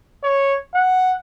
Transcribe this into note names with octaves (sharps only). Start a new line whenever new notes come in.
C#5
F#5